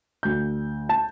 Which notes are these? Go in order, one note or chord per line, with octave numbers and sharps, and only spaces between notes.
D2 G6
A5